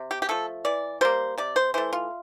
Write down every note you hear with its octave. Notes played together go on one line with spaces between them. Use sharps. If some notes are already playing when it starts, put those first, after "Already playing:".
Already playing: C3
G4
G4
F3 A3 A4
E3 D5
G3 A#3 C5
C3 D5
C5
E3 A3 C5
F4